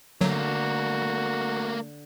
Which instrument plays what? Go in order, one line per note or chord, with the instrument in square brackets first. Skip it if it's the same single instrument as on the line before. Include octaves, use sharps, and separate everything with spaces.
[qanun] D3 [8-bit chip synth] F#3 [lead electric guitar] A3 A#3 [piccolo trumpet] F#4